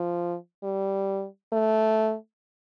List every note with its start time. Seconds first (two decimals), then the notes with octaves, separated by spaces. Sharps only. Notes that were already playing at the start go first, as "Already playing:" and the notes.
Already playing: F3
0.64 G3
1.53 A3